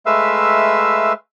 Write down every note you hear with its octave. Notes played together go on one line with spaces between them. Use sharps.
G#3 A3 B4 E5 F5 E6